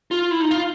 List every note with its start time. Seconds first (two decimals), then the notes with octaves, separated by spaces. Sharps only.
0.11 F4
0.31 E4
0.41 D#4
0.51 F4